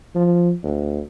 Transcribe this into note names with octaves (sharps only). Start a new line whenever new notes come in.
F3
D2